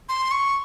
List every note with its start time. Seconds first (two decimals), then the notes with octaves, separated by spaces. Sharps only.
0.09 C6
0.31 C#6